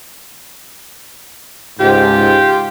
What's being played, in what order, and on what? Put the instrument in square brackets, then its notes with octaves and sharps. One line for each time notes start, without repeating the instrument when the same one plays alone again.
[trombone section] C#2 G#2 [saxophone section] F4 G4